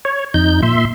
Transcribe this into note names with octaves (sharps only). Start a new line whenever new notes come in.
C#5
F2 D#4 G6
A#2 E5 C6